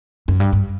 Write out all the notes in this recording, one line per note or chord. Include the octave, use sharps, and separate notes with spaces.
F#2
G2
G2